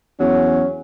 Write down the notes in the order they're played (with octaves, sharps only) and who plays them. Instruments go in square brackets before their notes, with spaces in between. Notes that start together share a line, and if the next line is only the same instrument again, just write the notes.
[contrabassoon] E2 [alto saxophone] F#3 [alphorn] C#4